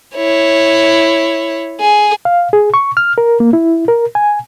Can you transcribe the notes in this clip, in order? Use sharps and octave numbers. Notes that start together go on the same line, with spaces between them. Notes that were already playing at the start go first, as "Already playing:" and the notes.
E4 C#5
G#4
F5
G#4
C#6
F6
A#4
A#3
E4
A#4
G#5